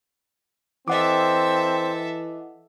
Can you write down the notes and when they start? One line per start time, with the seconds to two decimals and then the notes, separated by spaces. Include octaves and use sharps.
0.88 E3 C4 A4 D#5 E5 F#5 D6